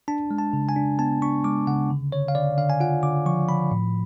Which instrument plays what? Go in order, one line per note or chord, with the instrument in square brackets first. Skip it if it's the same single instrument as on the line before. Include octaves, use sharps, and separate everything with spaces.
[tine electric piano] D4 A5
G#3
A5
C#3
G#5
D4
B3 A5
D4 C#6
G#3 D6
C#3 F#5
D3
D3 C#5
F5
D3 D5
D3 F5
G#5
F4 F#5
D3 D6
F3 C#6
F3 B5
A2